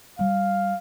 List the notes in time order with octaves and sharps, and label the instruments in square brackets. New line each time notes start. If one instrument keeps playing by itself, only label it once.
[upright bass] G3 [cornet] F5